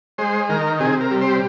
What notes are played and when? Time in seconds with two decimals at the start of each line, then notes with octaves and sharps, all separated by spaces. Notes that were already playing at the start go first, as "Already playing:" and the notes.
0.18 G#3 C5
0.49 D#3 A#4
0.80 C3 G#4
1.01 A#4
1.11 G3
1.21 C5